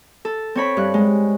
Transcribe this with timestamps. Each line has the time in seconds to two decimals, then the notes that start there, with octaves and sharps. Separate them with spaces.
0.25 A4
0.55 C4 C#5 B5
0.77 G2 F#6
0.94 G#3